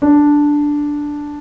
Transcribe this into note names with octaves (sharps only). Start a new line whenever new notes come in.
D4